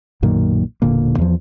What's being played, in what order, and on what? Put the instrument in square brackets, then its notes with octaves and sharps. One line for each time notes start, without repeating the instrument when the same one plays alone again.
[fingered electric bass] B1 F#2 A#2 D#3
E1 A#2 D3 A#3
E2 F3